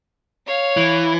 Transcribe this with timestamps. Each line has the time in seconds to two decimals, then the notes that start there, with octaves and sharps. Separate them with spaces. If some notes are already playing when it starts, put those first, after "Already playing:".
0.45 C#5 F5
0.77 E3